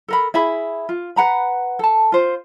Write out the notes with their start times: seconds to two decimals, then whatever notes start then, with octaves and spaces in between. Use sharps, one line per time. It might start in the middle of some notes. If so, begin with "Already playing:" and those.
0.08 A4 A#4 B5
0.34 E4 G#4 E5 B5
0.89 F4
1.16 B4 F#5 A#5 B5
1.79 A4 A5
2.12 F4 C5